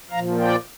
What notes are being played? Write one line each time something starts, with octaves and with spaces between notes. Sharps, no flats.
A#2 F3 F5 A#5
D5 G5